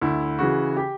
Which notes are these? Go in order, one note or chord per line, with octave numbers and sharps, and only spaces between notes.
D2 E4
C#3 E3 F#4
G4